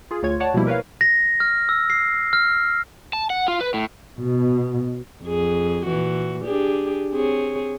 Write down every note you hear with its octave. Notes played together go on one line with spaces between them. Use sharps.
F4 G#4
D2 F4 C#5 G#6
C#5 D5 F#5 A5
B2 F3 G3 A#3 E4 G4
A#4 B4 C#5 F5
A#6
F6
E6
C7
F6
A5
F#5
F4
B4
A2
B2
F2 G#4
A#2 E3 F#4
D4 G4 G#4
C4 G#4 C#5